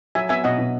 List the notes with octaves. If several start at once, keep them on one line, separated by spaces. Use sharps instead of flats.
F#3 E5 G#5
B3 E5 G#5
B2 D#5 F#5
B2